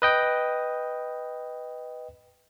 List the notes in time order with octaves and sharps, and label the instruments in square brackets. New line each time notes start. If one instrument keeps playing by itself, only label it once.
[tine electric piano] B4 D#5 G5